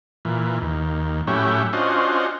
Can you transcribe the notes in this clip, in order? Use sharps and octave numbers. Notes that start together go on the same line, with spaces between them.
A#2 E3
D#2
A2 F#3 C#4 E4 G4
C#4 D4 F4 F#4 C5 D#5